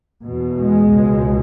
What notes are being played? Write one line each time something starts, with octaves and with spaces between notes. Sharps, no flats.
E2 B2
G#3
C#2 B2